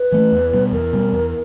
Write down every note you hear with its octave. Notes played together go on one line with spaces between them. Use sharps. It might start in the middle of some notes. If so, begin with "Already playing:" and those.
Already playing: B4
E3 A3
E2
B2 G3
E2 A#4
B2 G3
E2